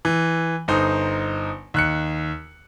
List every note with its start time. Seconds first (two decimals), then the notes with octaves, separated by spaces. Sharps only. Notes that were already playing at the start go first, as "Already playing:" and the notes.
0.05 E3
0.68 G1 D#4 C5
1.74 D#2 F#6 C#7